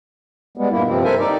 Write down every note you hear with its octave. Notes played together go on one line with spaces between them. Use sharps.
G3 G#3 B3
G2 A#2 A#3 E4
G2 C3 F3 C4
A4 A#4 C5 E5 G#5
D#3 D#4 D5